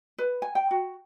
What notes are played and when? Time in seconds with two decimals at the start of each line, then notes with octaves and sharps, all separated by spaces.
0.18 B4
0.42 G#5
0.55 G5
0.71 F#4